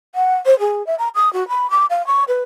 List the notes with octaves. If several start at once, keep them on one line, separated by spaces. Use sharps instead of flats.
F#5
C5
G#4
E5
A#5
D#6
F#4
B5
D6
F5
C#6
B4